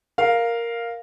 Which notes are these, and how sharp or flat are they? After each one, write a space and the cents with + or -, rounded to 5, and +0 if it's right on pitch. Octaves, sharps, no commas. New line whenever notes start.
A#4 +0 F5 +0